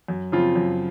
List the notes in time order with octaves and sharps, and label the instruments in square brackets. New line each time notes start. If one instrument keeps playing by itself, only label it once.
[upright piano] F#2
C#3 F3 C4 F4
F#2